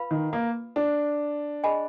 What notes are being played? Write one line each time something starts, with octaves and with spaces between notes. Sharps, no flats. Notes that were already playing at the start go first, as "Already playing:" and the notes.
Already playing: F4 B4 F5 B5
D#3
A#3
D4
G#4 D#5 G#5 B5